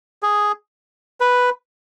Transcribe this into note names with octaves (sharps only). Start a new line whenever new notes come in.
G#4
B4